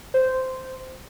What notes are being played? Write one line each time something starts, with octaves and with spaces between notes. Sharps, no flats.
C5